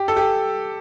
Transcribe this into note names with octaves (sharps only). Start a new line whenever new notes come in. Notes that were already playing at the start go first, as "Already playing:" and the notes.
Already playing: G4
A4
G4